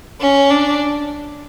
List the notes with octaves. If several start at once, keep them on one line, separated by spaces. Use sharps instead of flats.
C#4
D4